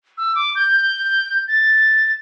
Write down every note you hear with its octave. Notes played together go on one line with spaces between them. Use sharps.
E6
D6
G6
A6